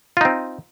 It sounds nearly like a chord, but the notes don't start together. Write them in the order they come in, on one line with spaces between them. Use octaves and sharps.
F4 D#4 C4